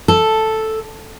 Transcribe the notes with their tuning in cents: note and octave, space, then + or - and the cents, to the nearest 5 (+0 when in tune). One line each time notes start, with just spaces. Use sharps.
A4 +0